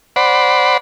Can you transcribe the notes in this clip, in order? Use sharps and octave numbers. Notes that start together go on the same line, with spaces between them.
C5 D5 F#5 B5